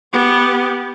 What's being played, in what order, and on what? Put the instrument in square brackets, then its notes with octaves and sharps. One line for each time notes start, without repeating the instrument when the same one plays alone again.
[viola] B3 G4